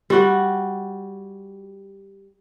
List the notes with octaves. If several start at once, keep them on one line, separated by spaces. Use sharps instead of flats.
G3 F#4